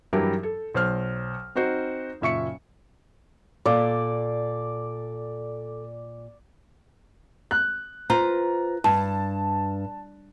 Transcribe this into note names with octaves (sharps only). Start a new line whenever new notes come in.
G2 E3 F#3 E4 G4 A#4
A4
B1 C5 F6
C4 D#4 F#4 C5
F#1 A#2 E5 C#6 C#7
A#2 A4 D5
F#6
F4 B4 C5 A#5
G2 A5